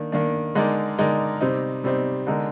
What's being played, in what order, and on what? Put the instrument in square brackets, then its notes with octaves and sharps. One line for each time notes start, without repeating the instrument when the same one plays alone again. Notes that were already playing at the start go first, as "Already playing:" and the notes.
Already playing: [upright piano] D#3 A#3 D4
D#3 A#3 D4
D3 G#3 D#4 A#4 D5
D3 G#3 D#4 A#4 D5
C3 G3 C4 D#4
C3 G3 C4 D#4
D3 G#3 D#4 A#4